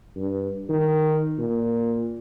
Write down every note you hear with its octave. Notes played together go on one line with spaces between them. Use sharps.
G2
D#3
A#2